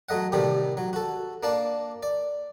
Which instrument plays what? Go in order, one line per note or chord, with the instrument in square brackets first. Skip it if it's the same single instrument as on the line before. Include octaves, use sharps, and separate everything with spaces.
[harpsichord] F#3 A3 D#5 F#5
A2 C3 D#3 G3 A3
F#3
F#4 A4
A#3 D4 A5
D5